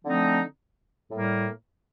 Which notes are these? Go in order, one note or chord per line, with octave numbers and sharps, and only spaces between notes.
D3 F3 A3 C4 D#4
A2 G3 A#3